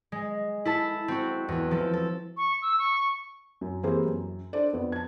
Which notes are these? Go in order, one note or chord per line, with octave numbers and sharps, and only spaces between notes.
G#3
E4 A4 A5
C4 F#4
E2
F3 A4
A4
C#6
E6
C#6
F#2
E3 A#3 C4 G4 G#4 C5
F#2
D4 A4 C5 D5
F2 B3
A5 G#6